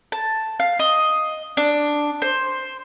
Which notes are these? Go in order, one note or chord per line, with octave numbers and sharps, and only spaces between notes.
A5
F5
D#5
D4
C5